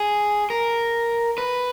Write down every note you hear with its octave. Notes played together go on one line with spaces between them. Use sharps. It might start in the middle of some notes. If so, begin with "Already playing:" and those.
Already playing: G#4
A#4
B4